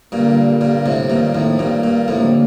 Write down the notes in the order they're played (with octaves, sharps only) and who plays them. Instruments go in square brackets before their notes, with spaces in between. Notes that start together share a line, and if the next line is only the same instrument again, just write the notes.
[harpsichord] G2 A#2 [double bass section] D3 G3 A#3
[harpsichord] G2 A#2
A2 C3
[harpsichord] G2 A#2 [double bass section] D#3 A#3
[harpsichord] F2 A2
G2 A#2
G2 A#2
[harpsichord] F2 A2 [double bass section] D3 G3 A#3